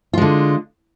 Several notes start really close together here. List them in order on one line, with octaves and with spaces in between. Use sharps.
F4 G#3 D3